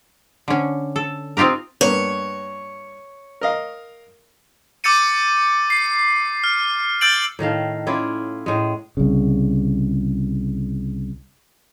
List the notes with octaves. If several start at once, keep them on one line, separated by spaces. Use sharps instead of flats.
D3 C#4
A4
C4 D#4 F4 G4 A#4
G2 A#3 B3 C#5
A#4 D#5 F5
D6 E6 G6 A6 C#7 D#7
C7
F6
E6 G6 A6 D7 F#7
A2 D#3 A3 F5
C#4 E4 F4 D5
A2 G#3
C2 C#3